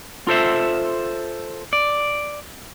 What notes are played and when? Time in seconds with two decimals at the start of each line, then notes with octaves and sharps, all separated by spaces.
0.27 F4 A4 C5 E5
1.73 D5